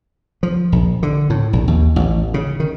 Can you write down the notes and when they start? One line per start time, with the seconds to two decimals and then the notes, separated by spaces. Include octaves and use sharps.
0.43 F3
0.72 A#1
1.03 D3
1.30 A2
1.53 A#1
1.68 D#2
1.96 A1
2.34 C#3
2.60 D#3